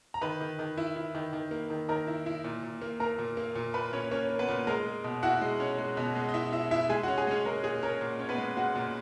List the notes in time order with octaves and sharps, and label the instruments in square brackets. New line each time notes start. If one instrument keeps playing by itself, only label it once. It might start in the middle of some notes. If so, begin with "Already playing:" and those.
[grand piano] A#5
D#3 B4 B5
D#3
D#3
E4
E4
D#3
D#3
A#3
D#3
D#3 A#4 A#5
E4
E4
A#2
A#2
A#3
A#3 A#4 A#5
A#2
A#3
A#2
A#2 B4 B5
A#2 C#4 C#5
A#3 C#4 C#5
A#3
B3 B4
A#2
G#3 A#4 A#5
G#3
B2
E4 F#4 F#5
G#3
C#4
G#3
B2
G#3
D#5
E4 E5
E4 E5
E4 E5
G#3 G#4 G#5
F#4 F#5
C#4
G#4 G#5
G#3 C#4 C#5
G#3 A#4
A#2 G#4
C#4 A#4
A#2
C#4 C#5
B3 B4
G#3
G#3 F#4 F#5
A#2